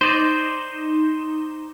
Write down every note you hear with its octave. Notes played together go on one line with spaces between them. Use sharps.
D#4 C5 D5 E7 G7